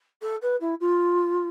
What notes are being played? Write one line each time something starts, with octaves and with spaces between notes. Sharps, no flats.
A4
B4
E4
F4